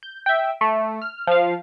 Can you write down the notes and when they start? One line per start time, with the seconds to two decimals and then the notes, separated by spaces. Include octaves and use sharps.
0.03 G6
0.26 E5 G5
0.61 A3
1.02 F6
1.27 F3 F5